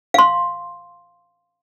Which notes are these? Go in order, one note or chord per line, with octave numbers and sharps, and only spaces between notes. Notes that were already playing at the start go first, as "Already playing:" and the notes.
F5 C6